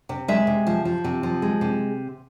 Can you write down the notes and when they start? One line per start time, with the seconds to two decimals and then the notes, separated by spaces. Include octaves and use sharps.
0.09 C3
0.28 G#3 E5
0.47 C3
0.67 F3
0.85 F3
1.04 C3
1.23 F3
1.42 G#3
1.61 C3